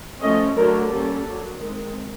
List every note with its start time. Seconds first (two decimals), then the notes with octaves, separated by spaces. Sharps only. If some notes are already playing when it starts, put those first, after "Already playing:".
0.21 F3 A3 C#4 D#5
0.55 D3 F#3 A3 D4 A#4
0.89 G3 A#3 C#4 A4
1.24 F#3 A#3 D4
1.59 D#3 G#3 C4